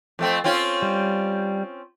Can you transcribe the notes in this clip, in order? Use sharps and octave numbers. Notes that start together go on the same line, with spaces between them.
F2 A3 C4
C4 C#4 F4
G3